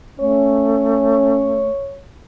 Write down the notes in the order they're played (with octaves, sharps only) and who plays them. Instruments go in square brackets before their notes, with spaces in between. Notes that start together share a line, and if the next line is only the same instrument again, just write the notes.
[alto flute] A3 [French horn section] C#4 [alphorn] C#5